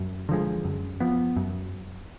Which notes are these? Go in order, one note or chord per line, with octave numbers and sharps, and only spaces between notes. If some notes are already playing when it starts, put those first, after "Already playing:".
Already playing: F#2
D3 F3 G#3
F#2
F3 B3
F#2